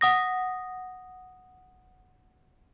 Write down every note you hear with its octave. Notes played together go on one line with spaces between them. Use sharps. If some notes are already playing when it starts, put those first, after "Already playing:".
F#5 D#6 A#6